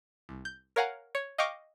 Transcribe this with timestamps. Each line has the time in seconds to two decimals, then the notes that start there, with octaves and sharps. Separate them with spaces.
0.29 C2
0.45 G6
0.76 A#4 C#5 F5 F#5 G#5 A#5
1.15 C#5
1.38 D#5 F5 G5 C#6 D6 F6